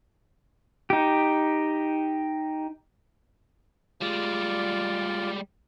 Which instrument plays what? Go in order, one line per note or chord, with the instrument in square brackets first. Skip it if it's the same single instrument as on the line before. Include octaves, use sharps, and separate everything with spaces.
[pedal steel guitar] D#4 G4
[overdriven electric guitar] G3 G#3 [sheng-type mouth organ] F4 D5